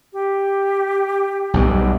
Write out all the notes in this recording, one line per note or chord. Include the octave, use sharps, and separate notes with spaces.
G4
B1 G2